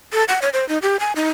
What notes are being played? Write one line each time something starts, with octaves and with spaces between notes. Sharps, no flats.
A4
F#5
C#5
C5
D#4
G4
G#5
D#4